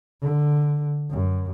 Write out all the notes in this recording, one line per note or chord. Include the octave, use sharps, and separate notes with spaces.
D3
F#2